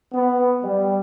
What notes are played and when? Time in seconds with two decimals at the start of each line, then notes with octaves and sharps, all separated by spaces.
0.12 B3
0.62 G3